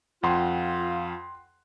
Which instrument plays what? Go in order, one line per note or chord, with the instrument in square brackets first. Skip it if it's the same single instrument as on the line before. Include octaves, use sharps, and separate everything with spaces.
[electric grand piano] F2 [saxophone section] F4 [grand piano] F#5 G5 C6